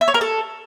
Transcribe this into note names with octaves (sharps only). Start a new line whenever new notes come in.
E5
C#5
A#4
A4